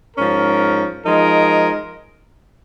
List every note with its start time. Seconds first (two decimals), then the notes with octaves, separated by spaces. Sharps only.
0.16 G#2 F3 C#4 A#4
1.04 F3 G#3 D#4 A#4